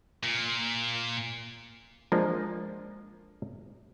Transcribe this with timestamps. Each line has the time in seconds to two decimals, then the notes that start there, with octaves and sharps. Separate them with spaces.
0.23 A#2
2.12 F3 G#3 A#3 D4